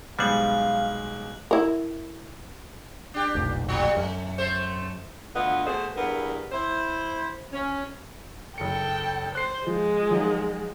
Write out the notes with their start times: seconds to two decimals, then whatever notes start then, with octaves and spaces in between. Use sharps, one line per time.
0.19 B1 G3 G#3 B3 C5 F5 F#6 F#7
1.51 E4 A#4
3.14 D4 G4
3.35 F1 B1 A#2
3.69 F3 G3
3.97 F#2 A3
4.38 A3 C5
5.34 D2 D3 B3 F4 D#5
5.67 B2 A3 G#4 A4 C5
5.96 E2 G2 B3 A#4
6.52 E4 C5
7.52 C#4
8.58 F#1 A4 G5 C#7
9.35 C5 F#6 C7
9.67 F3 G#3
10.10 D#3 F3 F#3